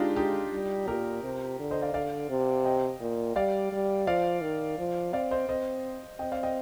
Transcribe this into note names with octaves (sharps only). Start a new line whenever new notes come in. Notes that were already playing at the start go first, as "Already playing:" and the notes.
Already playing: G#3 D4 D#4 F4 G4
D#4 G4
G3
A#2 G4 A#4
C3
D3
C5 D#5
D5 F5
D3 D5 F5
C3
D#5 G5
A#2
G3 D5 F5
G3
F3 D5 F5
D#3
F3
C4 D5 F5
C5 D#5
C4 C5 D#5
C4 D#5 G5
D5 F5
D#5 G5